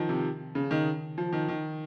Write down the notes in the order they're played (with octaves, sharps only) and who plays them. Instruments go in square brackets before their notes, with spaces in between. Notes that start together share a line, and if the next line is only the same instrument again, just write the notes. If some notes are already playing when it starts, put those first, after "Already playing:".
Already playing: [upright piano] D#3 F3
C3
C#3
D#3
F3
D#3
D#3